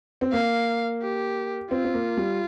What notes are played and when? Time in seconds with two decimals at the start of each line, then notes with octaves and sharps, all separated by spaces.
0.21 C4
0.32 A#3 F5
1.02 G4
1.71 C4 F4
1.85 C4
1.94 A#3
2.17 G3